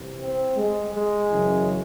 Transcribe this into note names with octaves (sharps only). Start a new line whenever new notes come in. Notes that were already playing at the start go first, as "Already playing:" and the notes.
Already playing: C2 C3 E3
C4
G#3
G#3
F#2 C#3 E3